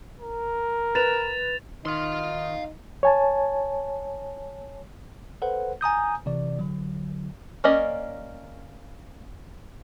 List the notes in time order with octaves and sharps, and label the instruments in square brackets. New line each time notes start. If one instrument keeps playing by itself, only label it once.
[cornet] A#4
[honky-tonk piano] B4 [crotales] A6 E7 F7
[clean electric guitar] D#3 [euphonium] D#4 [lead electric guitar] F5 C6
[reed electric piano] C#5 G#5 A5
[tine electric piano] A4 B4 C5 F#5
G#5 A#5 D#6 G6
C3 E3 D5
D3 F#3
[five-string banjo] A#3 C#4 D5 D#5